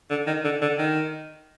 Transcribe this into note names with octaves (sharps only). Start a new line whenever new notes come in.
D3
D#3
D3
D3
D#3